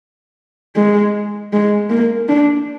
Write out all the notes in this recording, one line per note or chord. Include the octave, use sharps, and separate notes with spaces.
G#3
G#3
A#3
D4